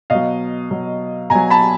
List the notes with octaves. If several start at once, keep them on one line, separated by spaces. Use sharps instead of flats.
B2 F#3 D#5 F5
B2 F#3
B2 F#3 G#5 A#5
A5 B5